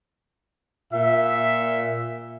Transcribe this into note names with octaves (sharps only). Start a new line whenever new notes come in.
A#2 E5